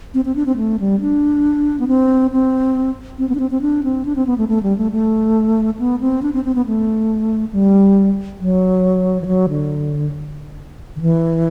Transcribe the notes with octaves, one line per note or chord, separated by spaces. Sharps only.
C4
C4
D4
C4
A3
G3
D4
B3
C4
C4
C4
B3
D4
C4
C4
D4
C4
D4
C4
B3
A3
A3
G3
A3
A3
B3
C4
D4
C4
C4
B3
A3
G3
F#3
E3
F#3
D3
D3
E3